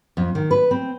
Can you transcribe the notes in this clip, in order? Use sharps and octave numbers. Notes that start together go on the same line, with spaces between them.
F2
D#3
B4
C4